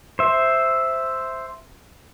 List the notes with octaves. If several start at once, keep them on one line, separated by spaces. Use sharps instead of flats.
C5 E5